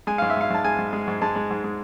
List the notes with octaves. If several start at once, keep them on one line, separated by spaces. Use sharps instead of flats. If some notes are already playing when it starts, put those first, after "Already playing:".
G#3 G#5
G#2 F5
E5
G#2 F5
G#2 A5
G#3 G#5
G#2
G#3
G#2
G#3 A5
G#3
G#2
G#3